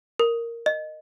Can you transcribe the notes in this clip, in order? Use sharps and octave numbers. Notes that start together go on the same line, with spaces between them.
A#4
D#5